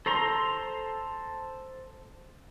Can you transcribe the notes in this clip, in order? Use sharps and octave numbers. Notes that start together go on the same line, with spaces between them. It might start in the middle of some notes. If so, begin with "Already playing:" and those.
A4 C5 A#5 C6